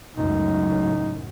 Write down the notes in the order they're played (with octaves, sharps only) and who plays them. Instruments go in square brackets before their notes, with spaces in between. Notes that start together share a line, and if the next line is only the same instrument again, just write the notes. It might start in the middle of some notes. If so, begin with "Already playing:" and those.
[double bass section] C#2 F#2 A2 [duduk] D#4